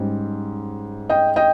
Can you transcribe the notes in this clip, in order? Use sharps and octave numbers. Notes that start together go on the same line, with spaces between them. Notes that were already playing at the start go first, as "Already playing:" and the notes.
Already playing: G#2 G3 C#4
D#5 G5
D#5 G5